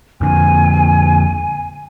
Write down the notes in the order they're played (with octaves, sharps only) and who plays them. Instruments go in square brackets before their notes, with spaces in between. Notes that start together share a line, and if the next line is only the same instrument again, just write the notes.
[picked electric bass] F2 D3 [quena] G#5